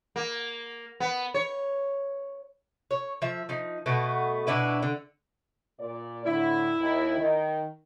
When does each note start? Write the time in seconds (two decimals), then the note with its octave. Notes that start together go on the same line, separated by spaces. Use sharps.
0.16 A#3
1.00 B3
1.34 C#5
2.91 C#5
3.22 F3 E5
3.49 F3 D#4
3.86 B2 A3 B3
4.47 B2 D4 E4 B4
4.82 D3
5.80 A#2 D5
6.26 A2 D3 E4
6.79 D#2
7.19 D#3